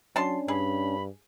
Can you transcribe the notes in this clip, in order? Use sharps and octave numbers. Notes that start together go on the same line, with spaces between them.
F#3 C#4 D4 A5 C6
G2 G#4 B5